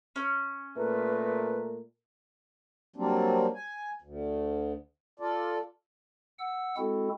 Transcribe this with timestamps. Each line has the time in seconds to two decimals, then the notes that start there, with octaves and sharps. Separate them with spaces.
0.16 C#4
0.76 A#2 A3 A#4 B4
2.96 F#3 G3 A#3 C4 D4
3.55 G#5
4.01 D2
5.19 F4 A4 D5
6.39 F#5 E6
6.77 G#3 C4 E4 F#4 A4